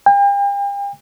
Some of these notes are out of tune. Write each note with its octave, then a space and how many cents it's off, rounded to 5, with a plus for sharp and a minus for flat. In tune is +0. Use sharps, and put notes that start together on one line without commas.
G5 +40